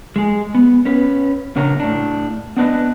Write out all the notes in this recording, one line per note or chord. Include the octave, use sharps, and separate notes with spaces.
G#3 G#4
B3
C#4 B4
A#2 C#3 D4 A#4 C#5 A#5
A2 D4
B3 D4 B4 D#5